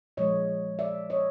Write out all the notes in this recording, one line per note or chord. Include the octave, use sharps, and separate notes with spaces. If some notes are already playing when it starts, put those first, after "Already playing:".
A#2 F3 G#3 C#5 D#5
D5 E5
C#5 D#5